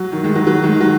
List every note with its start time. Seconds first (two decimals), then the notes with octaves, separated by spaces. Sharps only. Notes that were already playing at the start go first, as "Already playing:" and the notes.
Already playing: F#3
0.12 D#3
0.23 D#3 G#3
0.35 F#3
0.47 F#3
0.63 D#3 G#3
0.81 F#3